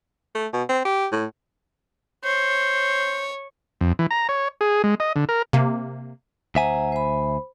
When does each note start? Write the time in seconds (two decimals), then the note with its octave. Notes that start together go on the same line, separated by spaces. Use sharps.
0.35 A3
0.53 B2
0.69 C4
0.85 G4
1.12 A2
2.24 C5 C#5
3.81 F2
3.99 E3
4.11 A#5
4.29 C#5
4.61 G#4
4.84 G#3
5.00 D#5
5.16 D3
5.29 A#4
5.53 C3 A#3
6.55 D2 C5 E5 F#5 G#5 A#5
6.92 C5 B5